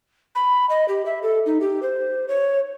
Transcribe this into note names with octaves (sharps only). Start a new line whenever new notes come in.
B5
D#5
G4
E5
A4
D#4
G4
C5
C#5